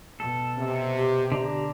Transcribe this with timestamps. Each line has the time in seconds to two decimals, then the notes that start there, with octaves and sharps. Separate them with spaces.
0.20 B2 A4
0.57 C3
0.97 G4
1.32 D3 D5 A#5